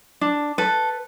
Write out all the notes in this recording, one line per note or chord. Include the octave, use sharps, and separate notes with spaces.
D4
A4 B4